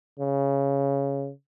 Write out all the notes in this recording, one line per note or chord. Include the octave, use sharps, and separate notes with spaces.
C#3